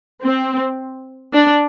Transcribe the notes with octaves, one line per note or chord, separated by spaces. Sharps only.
C4
D4